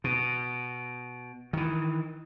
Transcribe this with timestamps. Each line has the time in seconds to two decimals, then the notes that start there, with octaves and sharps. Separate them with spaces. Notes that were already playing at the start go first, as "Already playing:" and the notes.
0.04 B2
1.53 D#3 E3